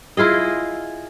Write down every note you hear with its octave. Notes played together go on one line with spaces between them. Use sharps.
E4 F4 G#4 D#5